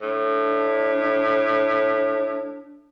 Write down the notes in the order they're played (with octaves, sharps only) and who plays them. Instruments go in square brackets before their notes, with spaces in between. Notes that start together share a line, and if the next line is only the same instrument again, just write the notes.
[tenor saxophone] A2 [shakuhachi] D4